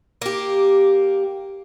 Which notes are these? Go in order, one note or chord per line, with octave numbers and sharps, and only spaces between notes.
A#3 G4